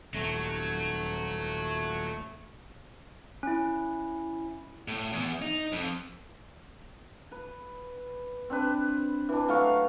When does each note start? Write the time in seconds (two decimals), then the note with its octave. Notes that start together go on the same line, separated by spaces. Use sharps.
0.14 D#1 F#3 A3
3.43 C#4 E4
4.88 A2
5.13 E2
5.42 D#4
5.72 F2
7.32 B4
8.50 C4 D4 B4
9.29 E3 D4
9.48 F#3 A3 F5 C#6